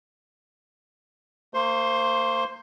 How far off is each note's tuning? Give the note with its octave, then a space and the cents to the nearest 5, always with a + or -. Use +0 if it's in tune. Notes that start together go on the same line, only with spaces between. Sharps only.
A#3 -35 C5 +0 C6 +15